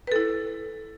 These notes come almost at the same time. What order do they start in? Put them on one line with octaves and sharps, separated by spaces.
B4 A4 E4